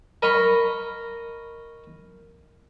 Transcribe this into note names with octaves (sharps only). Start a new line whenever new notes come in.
A#4 D#5 A#5 B5 C#6